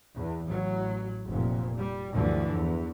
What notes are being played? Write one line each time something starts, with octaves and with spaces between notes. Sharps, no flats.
E2
A1 F#3
F1 A#2
G3
D2 G2 D3 E3 F3
E2